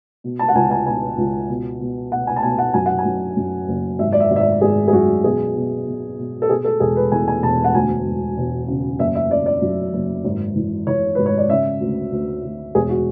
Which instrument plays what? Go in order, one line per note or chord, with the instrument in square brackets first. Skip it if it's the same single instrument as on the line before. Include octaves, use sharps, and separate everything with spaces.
[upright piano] B2
A5
F#5
C#2 G#5
G#5
B2 G#5
C#2
B2
B2
B2 F#5
G#5
A5
B2 G#5
F#5
F#2 G#5
F#5
G#5
F#2
F#2
F#1
G#1 E5
D5
E5
G#1
E5
D5
G#1 G#4
G#4
F#2 F#4
B2 G#4
B2
B2
B2
A4
B2 G#4
A4
E1 G#4
B4
E2 G#5
G#5
E1 A5
F#5
D2 G#5
E1
E1
C#3
F#1 E5
E5
C#3 D5
D5
F#2
F#1
G#1
E3
E3 C#5
G#1 B4
C#5
D5
C#3 E5
D2
D2
D2
E1 G#4
F#4